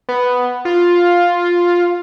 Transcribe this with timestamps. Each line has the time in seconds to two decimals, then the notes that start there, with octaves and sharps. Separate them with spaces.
0.09 B3
0.65 F4